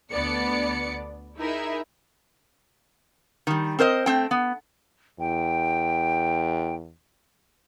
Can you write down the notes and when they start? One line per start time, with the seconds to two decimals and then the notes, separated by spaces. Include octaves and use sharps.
0.12 D2 B3 D4 D5 C#7
1.38 D#4 E4 G#4 A#4 E5
3.47 D#3 G3
3.79 C4 A#4 C5 D#5
4.06 A3 C4 G5
4.31 B3
5.20 E2 G5